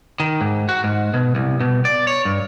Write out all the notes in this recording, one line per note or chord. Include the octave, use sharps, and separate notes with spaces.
D#3
G#2
F#4
G#2
B2
C2
B2
D5
C#5
G2